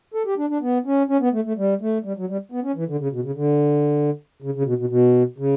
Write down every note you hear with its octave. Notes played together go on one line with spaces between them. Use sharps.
A4
G4
D4
D4
B3
C#4
C#4
B3
A3
A3
G3
A3
G3
F#3
G3
B3
C#4
E3
D3
C#3
B2
C#3
D3
C#3
C#3
B2
B2
B2
C#3